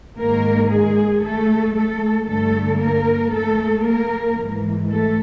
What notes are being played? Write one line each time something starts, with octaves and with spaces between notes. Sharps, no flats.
G#2 D#3 A#3 A#4
G#3 G#4
A3 A4
A3 A4
G2 D3 A3 A4
A#3 A#4
A3 A4
A#3 A#4
G#2 E3
A3 A4